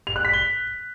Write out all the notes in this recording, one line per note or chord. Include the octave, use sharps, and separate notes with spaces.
F7
F#6
B6
G7